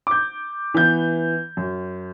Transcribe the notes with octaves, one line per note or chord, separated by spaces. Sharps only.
D6 G6
E3 B3 G6
F#2